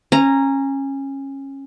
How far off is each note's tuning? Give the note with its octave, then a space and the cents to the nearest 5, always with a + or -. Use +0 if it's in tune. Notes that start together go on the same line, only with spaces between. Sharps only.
C#4 -20 A#5 +0